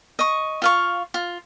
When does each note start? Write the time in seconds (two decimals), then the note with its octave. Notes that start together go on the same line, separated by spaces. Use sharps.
0.19 D#5 C#6
0.62 F4 F5 C#6
1.14 F4